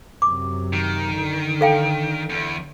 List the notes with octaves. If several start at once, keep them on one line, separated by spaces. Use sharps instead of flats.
F#2 C3 F#3 D6
D#3
D3
A4 F5 G5
E2